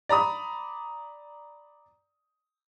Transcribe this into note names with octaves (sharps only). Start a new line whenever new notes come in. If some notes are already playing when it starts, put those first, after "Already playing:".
D5 A#5 B5 D#6